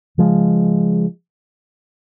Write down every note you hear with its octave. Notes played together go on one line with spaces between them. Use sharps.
C#3 F3 G#3